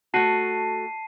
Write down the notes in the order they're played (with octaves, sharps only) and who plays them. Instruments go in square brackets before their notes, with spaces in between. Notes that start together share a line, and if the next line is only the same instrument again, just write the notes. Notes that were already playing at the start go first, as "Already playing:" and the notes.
[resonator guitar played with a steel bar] A3 F#4 [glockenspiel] A5 C7 D#7